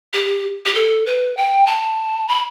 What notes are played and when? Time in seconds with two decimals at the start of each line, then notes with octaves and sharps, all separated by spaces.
0.13 G4
0.66 G4
0.75 A4
1.06 B4
1.37 G5
1.67 A5
2.28 B5